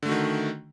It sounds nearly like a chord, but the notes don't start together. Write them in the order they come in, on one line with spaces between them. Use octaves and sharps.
D3 A3 F#4 D#3